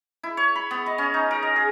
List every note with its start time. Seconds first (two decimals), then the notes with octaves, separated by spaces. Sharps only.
0.23 E4
0.37 C#5
0.55 B5
0.71 B3
0.86 D#5
0.98 C#4
1.14 D#4
1.31 A#4
1.43 D#5
1.56 G#4